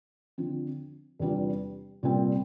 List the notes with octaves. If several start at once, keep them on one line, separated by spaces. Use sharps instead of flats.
D3 F3 C4
E2 C3 G3 D4 F4
C2 A#2 G3 C4